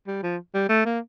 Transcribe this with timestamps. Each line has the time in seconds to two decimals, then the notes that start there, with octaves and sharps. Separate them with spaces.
0.07 G3
0.23 F3
0.54 G3
0.69 A3
0.85 A#3